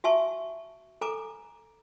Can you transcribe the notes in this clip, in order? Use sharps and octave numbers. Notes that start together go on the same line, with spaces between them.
F#4 E5 G#5 A5 C#6
A4 G#5 A#5 D6